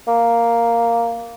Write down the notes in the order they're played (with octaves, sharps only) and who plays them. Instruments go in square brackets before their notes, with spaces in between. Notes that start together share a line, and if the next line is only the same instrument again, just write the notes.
[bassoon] A#3